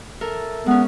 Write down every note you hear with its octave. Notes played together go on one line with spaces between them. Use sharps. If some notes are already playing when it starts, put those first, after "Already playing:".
A4 A#4 E5
G#3 B3 C#4